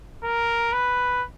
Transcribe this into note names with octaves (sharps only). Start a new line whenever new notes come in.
A#4
B4